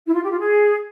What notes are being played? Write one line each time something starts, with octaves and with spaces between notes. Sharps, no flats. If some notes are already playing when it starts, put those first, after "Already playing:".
E4
F4
G4
F4
G#4